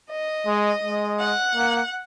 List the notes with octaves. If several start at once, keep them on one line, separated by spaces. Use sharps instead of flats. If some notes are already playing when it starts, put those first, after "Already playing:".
D#5
G#3
G#3
F#5
A#3